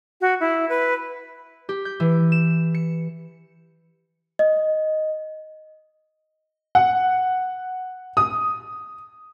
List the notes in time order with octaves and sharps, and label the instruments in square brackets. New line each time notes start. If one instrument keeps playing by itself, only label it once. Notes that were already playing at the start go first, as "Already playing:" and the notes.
[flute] F#4
E4
B4
[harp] G4
G6
E3
E7
C#7
[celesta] D#5
[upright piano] F#5
D#6